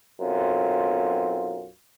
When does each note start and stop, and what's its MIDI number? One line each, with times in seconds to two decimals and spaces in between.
0.20 1.66 35
0.20 1.66 42
0.20 1.66 60
0.20 1.66 65